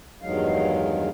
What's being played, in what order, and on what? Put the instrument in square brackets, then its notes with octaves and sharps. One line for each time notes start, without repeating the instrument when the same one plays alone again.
[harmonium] E2 G2 D#3 F#3 G#3 F5